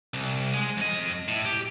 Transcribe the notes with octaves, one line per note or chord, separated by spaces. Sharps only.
C2
G#3
F2 D#5
A2
G4